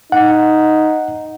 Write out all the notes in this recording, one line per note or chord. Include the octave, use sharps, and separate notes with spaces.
D#4 F#5